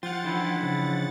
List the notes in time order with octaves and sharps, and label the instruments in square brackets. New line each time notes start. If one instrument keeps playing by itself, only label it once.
[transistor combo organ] F3 G5 C6 [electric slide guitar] F4 [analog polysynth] F#5 A6
[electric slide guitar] D3 E3 [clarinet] E4
[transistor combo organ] C#3 F3